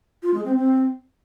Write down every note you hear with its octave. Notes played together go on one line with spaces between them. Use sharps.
F4
G#3
C4
C4